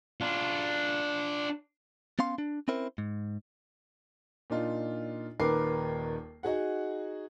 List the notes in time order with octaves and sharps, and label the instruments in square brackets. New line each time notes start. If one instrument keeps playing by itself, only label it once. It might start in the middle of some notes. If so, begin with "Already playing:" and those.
[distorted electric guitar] D4 F4
[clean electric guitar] B3 C#4 F5 C6
D4
C4 C#4 E4 A#4 C5
G#2
[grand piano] A#2 D4 D#4 F4
D#1 D#2 A#4 B4 D6 C7
D#4 F#4 G#4 F#5